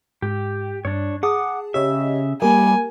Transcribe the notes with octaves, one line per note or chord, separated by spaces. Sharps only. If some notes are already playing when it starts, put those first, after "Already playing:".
G#2 G4
G2 D4 C#5
G#4 F#5 A5 D6 D#6
C#3 G4 C#5 D#5 E5
G3 A#3 G4 A#4 G#5